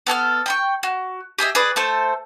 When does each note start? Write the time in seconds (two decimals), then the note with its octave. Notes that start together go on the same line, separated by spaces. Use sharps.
0.07 B3 A4 G#5 F6
0.46 G5 B5 C#6
0.83 F#4
1.38 G4 G#4 D#5 E5
1.55 G#4 B4 D5
1.76 A3 A4 C5